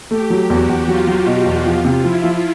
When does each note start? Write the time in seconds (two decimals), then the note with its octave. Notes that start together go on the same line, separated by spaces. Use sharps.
0.11 A3 G4
0.30 F#3
0.50 E2 F#4
0.69 E2
0.88 F#3 F4
1.07 F#3
1.27 B2
1.46 E2
1.65 F3 F4
1.85 C3
2.04 F3 E4
2.24 F3